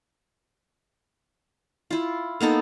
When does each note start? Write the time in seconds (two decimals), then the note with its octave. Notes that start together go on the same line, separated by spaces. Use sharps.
1.91 E4 F4
2.40 A#3 B3 D#4 A4